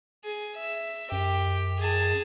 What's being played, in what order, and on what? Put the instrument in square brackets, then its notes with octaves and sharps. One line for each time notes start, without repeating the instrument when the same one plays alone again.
[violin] G#4
E5
[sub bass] F#2 [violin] G4
[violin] G#4 A5